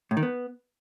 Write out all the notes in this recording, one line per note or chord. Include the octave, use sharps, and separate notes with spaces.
A2
D#3
B3